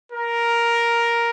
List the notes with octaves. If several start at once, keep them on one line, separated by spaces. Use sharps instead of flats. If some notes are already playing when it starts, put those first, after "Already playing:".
A#4